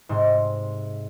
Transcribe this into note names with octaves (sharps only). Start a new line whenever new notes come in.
G#2 C3 C6